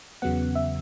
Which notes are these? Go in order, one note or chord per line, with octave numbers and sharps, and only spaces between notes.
E2 C#3 F#3 B3 F#5
E5